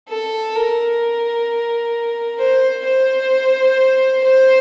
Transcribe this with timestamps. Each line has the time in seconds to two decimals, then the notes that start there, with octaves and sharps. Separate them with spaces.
0.09 A4
0.55 A#4
2.39 C5
2.86 C5
4.24 C5